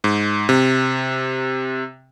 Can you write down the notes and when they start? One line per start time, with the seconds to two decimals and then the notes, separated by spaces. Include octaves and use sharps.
0.04 G#2
0.49 C3